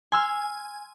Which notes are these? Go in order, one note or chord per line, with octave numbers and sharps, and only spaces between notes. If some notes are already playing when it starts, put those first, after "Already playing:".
G#5 C6 E6 F6